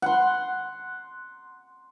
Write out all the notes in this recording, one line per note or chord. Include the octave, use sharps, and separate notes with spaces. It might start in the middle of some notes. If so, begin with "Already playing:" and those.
F#5 C6